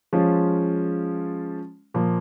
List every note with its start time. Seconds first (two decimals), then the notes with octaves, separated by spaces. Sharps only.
0.13 F3 G#3 C#4 F4
1.94 A#2 F3 A#3